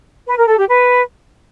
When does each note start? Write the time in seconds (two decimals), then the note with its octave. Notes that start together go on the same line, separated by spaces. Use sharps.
0.27 B4
0.38 A#4
0.48 A4
0.58 G4
0.68 B4